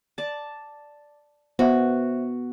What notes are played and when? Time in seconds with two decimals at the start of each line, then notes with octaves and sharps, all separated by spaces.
0.18 D5 A5
1.59 B3 F#4 C5 E5